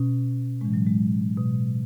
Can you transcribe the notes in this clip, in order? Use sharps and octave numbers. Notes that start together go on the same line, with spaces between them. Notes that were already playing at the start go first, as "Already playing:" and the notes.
Already playing: B2 C#4
A2 E3 G#3
F#3
G#3
B2